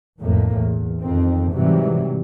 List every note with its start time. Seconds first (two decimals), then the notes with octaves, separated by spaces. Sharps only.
0.20 B1 F2 A2 A#3
0.56 E2
0.99 F2 D#3 C4
1.53 G#2 C3 E3 F#3 G3